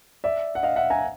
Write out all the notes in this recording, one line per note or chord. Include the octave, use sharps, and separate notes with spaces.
D5 E5
F#5
D#5 F5
E5 F#5
G#5 A#5